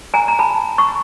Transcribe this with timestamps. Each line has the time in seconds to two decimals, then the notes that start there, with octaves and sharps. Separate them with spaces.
0.14 G#5 A#5
0.28 A#5
0.39 A5 B5
0.78 C#6